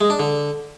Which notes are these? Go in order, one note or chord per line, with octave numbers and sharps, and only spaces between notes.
G#3
D4
D3